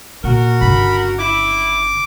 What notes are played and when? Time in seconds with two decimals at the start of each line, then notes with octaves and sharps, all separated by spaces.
0.24 A#2 F#4 A#4
0.61 G1 C#3 B5
1.19 E4 D6